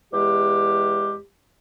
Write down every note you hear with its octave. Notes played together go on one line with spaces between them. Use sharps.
E2 G#3 G4